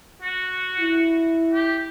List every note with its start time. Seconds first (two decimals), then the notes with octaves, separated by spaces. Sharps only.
0.23 F#4
0.81 E4
1.54 G4